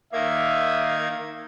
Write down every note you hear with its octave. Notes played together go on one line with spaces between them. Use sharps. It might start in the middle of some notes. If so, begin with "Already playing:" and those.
D#3 A#3 D#4 E5 G#6